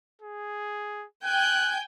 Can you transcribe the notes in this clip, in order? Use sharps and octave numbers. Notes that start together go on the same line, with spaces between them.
G#4
G5 G#5 F#6 G6